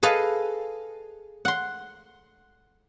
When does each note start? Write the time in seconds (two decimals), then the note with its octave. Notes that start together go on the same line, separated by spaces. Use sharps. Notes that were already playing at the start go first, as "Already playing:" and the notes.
0.03 G#4 A4 B4 D#5 F5
1.45 F#5 C6